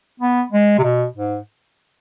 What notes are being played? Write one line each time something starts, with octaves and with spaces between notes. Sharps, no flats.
B3
G#3
C3
B2
G#2